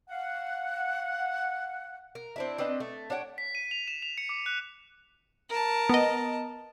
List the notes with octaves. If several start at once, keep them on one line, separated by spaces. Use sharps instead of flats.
F5 F#5
A#4
C4 D4 E4
C4 D4 B4 D#5
A3
D4 C#5 F#5 G5
B6
D#7
F7
E7
F7
C#7
D6
F#6
A#4 A5
B3 D#5